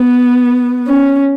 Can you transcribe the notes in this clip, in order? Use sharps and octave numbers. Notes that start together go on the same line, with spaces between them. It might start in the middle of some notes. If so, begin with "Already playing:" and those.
Already playing: B3
C#4